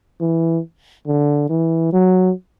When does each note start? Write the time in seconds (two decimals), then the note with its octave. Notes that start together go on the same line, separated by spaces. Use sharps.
0.21 E3
1.07 D3
1.49 E3
1.93 F#3